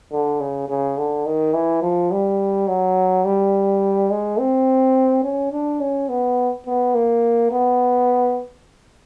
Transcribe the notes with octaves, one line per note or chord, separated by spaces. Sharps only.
D3
C#3
C#3
D3
D#3
E3
F3
G3
F#3
G3
G#3
C4
C#4
D4
C#4
B3
B3
A#3
B3